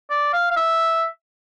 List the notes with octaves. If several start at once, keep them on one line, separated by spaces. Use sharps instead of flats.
D5
F5
F5
E5